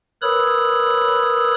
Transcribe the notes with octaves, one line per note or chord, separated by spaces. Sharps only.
A#4 B4 C#5 B5 D#6 E6